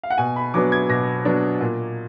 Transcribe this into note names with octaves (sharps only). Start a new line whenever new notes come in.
F5
F#5
B2 G#5
B5
F#3 B3 D4 D6
G#6
B2 A#6
F#3 B3 D4
A#2